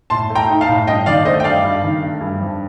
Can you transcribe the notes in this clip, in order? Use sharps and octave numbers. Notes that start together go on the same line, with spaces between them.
A2 A5 C6
A3
G5 A#5
D#4
F5 A5
A2
G2 D#5 G5
D#3 D5 F5
A3 C5 D#5
G5
G2 D5 F5
G2
D#3
A3
G2
F2